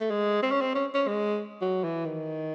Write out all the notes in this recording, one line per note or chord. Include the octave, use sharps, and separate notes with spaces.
A3
G#3
C4
C#4
C4
C#4
C#4
G#3
F#3
E3
D#3